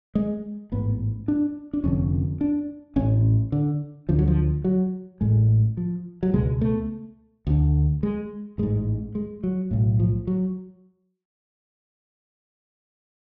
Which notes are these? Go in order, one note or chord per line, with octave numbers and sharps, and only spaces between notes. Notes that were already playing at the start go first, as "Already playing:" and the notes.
G#3
A1 G#2 B3
D4
D4
F1 F2 D3 C#4
D4
A1 A2 C#4
D3
D2 D3 F3
F#3
F3
F#3
A1 A2 G#3
F3
F#3
C#2 B2 G#3
A3
D2 D3
G#3
A1 G#2 G#3
G#3
F#3
B1 A2
F3
F#3